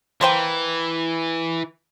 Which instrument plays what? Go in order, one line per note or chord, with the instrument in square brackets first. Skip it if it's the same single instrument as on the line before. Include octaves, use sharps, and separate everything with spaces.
[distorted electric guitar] E3 [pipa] A#3 C5 G5